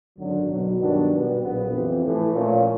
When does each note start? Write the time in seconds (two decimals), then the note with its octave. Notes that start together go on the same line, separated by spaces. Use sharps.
0.18 G#1 F#2 D3 F#3
0.50 B1 B2 F#3
0.80 G2 D#3 F#3 B3 D4
1.10 B2 G3 B3
1.41 A#1 A#2 F#3 B3
1.72 F2 C3 E3
2.03 A2 E3 A3
2.33 A#2 F3 A3 C#4 F4